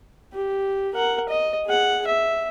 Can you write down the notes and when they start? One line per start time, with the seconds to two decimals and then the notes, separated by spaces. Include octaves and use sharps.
0.33 G4
0.94 A#4 F#5
1.29 D#5
1.66 G#4 F#5
2.07 E5